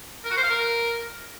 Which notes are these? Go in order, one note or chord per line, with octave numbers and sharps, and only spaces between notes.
A#4
F#4
C5
F5
A#4